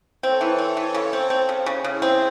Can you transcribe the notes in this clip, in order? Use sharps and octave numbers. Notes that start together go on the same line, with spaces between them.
C4 A4 C#5
E3
C4
E3 A4 C#5
C#3
C4
C4
C#3
C#3
C#3 E4 G#4
C4